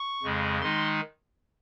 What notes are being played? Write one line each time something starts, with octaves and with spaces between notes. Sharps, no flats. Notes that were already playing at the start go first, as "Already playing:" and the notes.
Already playing: C#6
F2 C#3 G#3
D#3 G#3 D#4 C6